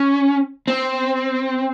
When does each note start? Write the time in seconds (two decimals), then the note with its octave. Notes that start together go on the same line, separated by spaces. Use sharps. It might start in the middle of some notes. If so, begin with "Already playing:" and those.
Already playing: C#4
0.68 C4